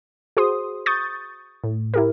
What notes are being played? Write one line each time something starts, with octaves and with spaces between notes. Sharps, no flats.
F#4 G#4 C5 C6 D#6
C#6 D#6 G6 A6
A2
E4 G4 A#4